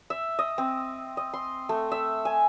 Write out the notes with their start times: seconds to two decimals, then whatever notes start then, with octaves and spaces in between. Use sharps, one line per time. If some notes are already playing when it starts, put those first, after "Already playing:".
0.10 E5
0.39 D#5
0.58 C4
1.17 D#5
1.33 C6
1.69 A3
1.92 E5
2.25 G#5